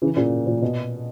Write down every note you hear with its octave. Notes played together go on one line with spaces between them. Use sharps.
C#3 E3
A#2 C#3
A#2
B2